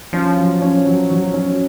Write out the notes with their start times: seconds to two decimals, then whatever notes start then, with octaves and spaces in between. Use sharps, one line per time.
0.13 F3 C#4
0.38 F#3
0.62 C#4
0.85 F#3
1.10 F#3
1.34 C#4